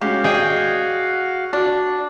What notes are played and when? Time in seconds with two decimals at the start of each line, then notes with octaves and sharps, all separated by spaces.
0.01 G#3 C#4 F#4 G4 F5
0.24 G#4 D5 D#5 G5
1.53 D4 F#4